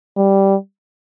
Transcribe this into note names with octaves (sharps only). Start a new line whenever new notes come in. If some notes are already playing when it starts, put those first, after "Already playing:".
G3